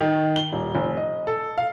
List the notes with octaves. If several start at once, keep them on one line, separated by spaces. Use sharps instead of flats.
D#3
G7
D#1
F1
D#5
A4
F5